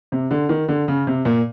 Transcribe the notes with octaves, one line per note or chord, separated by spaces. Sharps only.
C3
D3
D#3
D3
C#3
C3
A#2